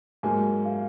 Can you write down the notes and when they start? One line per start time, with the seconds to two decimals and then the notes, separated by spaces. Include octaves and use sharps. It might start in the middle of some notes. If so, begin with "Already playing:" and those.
0.23 G#2 F#3 A#3 G#5
0.65 F5